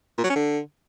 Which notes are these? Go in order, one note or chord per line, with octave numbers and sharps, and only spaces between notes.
A#2
F#3
C#4
D3